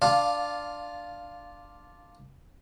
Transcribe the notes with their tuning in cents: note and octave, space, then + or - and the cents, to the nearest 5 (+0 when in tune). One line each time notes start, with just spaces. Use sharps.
D4 +0 F4 +0 F5 +20